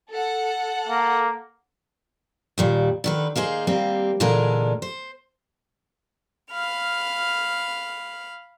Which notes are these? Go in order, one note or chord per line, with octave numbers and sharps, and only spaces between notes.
A4 F#5
A#3
D#2 A#2 G3
D3 D#3 B4
A#3 D#4 G#4 C5
G3 A#3 C4
A#2 D3 E3 G#3 D4 A#4
C5
F5 B5 F6